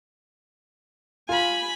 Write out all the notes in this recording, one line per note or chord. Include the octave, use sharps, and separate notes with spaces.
F4 G#5 B5